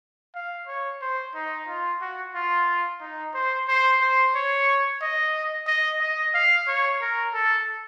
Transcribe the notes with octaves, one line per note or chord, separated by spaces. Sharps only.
F5
C#5
C5
D#4
F4
F#4
F4
D#4
C5
C5
C5
C#5
D#5
D#5
D#5
F5
C#5
A#4
A4